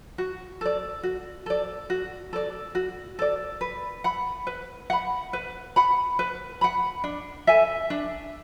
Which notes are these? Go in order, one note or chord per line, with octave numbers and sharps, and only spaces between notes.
F#4
A4 D5
F#4
A4 D5
F#4
A4 D5
F#4
A4 D5
B4
F#5 B5
B4
F#5 B5
B4
F#5 B5
B4
F#5 B5
D4
A4 E5 G#5
D4